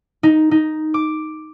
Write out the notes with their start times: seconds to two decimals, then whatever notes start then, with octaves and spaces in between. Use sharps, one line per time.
0.23 D#4
0.51 D#4
0.94 D6